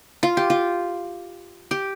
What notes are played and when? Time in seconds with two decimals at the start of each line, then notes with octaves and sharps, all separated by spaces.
0.23 F4
0.37 G4
0.50 F4
1.71 G4